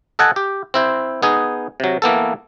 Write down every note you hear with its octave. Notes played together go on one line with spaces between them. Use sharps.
A4 D#5 F#5 G#5 A5
G4
C4 E4 C5
B3 D#4 G#4
C3 F#3
E3 A#3 B3 A4